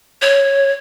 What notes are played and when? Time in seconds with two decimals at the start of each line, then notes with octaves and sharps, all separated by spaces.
0.22 C#5